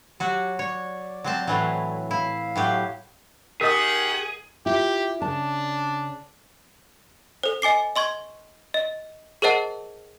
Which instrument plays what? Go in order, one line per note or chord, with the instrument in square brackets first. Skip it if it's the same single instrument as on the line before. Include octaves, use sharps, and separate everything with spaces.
[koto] F#3 F#4 [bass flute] G4
[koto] C#5 [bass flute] D5
[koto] F#3 C4 A5
A2 E3 F#3
[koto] E4 [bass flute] F5
[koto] A2 F#3 G4
[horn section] D#3 G4 F#5 [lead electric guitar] G#4 [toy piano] A#4 D#5 [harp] D#6 B6
[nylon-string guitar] E4 F4 [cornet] G4
[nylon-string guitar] C#3 A5 [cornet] D4
[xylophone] A4 C5
D#5 G#5 D6 C7
D#5 C6 C#6 G#6
D#5
G#4 A#4 C5 D#5 F#5 A5